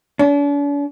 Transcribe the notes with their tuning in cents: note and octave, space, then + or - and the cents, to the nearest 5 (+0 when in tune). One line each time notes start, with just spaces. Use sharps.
D4 -45